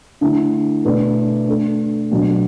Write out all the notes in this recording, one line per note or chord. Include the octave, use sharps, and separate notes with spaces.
D3 A3 E4
B2 A3 D4 B4 D5
A3 D4 A4
B2 F#3 D4